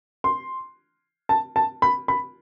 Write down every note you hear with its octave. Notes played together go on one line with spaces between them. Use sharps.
C6
A5
A5
B5
B5